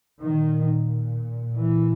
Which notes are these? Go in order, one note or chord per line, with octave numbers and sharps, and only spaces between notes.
A#2 D#3
E3